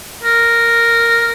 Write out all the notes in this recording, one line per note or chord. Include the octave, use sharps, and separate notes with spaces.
A#4